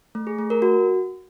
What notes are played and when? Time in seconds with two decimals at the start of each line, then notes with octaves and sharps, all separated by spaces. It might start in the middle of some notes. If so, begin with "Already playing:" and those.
0.15 A3
0.27 G#4
0.39 A3
0.50 A#4
0.62 F#4